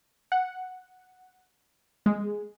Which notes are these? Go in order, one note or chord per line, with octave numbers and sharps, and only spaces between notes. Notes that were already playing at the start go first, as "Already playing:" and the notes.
F#5
G#3